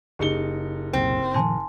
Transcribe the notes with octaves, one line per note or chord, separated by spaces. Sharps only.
F#1 D#4 G4 G#4 C#7 G7
C2 F#2 A#2 C4
A#2 D#3 F3 G#5 A5 C6